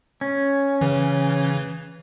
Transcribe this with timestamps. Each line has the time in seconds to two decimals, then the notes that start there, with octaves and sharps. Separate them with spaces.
0.21 C#4
0.81 C#3 E3